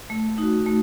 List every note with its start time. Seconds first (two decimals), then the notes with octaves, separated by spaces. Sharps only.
0.10 A3
0.38 D#4 F#4
0.66 A3